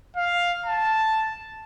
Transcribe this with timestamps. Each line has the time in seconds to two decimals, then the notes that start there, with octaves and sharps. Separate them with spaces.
0.17 F5
0.66 A5